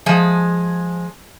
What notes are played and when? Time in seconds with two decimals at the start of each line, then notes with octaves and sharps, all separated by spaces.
0.06 F3 G#3 G#4